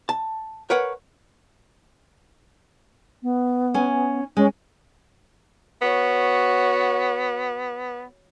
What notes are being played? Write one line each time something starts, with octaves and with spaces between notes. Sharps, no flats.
A5
A#4 B4 C#5 F#5
B3
C#4 G#5
G#3 C#4
B3 F#4 C#5